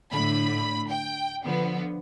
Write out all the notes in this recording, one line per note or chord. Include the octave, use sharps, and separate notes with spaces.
A2 D3 B5
G5
D3 F3 B3